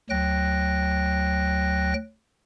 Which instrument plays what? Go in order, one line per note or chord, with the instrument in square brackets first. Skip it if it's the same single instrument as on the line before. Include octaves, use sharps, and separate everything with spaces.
[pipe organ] D2 F#3 G5 F#6 A#6